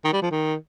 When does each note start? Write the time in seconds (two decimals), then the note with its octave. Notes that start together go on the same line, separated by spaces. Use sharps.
0.04 D#3
0.13 G3
0.22 F3
0.31 D#3